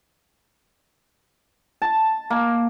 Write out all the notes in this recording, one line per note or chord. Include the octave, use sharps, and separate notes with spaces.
A5
A#3